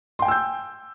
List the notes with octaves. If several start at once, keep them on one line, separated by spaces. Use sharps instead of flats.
G5 G#5 C6 E6 G6